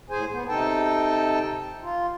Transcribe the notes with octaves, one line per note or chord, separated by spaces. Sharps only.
A2 G#4 C5 G#5
B3
C3 D#4 A4 G5 A5
F4